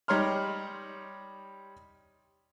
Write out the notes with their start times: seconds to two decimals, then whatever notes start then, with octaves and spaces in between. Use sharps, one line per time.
0.08 G3 D#4 C#5 A#5 C6 F6